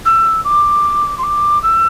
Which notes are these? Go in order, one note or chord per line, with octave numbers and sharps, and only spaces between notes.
E6
D6
C6
D6
E6